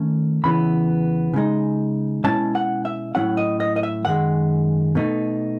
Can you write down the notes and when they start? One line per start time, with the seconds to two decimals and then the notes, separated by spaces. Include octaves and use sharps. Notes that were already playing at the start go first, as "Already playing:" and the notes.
Already playing: D#3 A3 C#4
0.44 E2 C#3 E3 B3 B5
1.34 C#3 G#3 D#4
2.24 B2 G#3 C#4 E4 A5
2.55 F#5
2.85 E5
3.15 A2 F#3 C#4 E4 F#5
3.37 D#5
3.60 D#5
3.76 D#5
3.83 E5
4.05 F#2 D#3 G#3 F#5
4.95 B2 A3 D#4